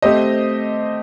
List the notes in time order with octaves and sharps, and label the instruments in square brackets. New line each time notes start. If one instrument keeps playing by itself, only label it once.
[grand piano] A3 C4 G4 C5 D#5